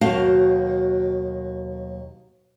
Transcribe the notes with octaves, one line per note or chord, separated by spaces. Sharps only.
D#2 B2 F#3 F#4 F5 A5